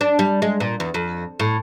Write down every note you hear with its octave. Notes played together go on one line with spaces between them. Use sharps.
D4
G3
G#3
A#2
E2
F2
A2